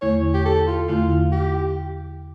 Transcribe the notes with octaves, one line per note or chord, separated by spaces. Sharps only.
E2 D3 A3 E4 C#5
G4
A4
F4
E2 D3 A3 E4 F4
G4